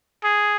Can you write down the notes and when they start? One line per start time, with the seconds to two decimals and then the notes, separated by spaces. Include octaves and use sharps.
0.24 G#4